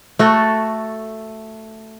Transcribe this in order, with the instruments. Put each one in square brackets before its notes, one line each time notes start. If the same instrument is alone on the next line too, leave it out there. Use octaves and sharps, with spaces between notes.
[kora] A3 F#4 A4